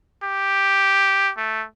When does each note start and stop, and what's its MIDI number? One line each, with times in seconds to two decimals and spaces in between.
0.23 1.32 67
1.37 1.65 57